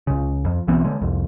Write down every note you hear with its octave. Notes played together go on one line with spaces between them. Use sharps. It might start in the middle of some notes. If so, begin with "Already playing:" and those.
C#2 C#3
F2
B1 E3 B3 C4
D3 G#3
C2 F2